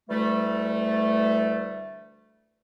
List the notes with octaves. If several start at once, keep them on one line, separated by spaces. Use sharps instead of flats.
D2 E3 G3 A3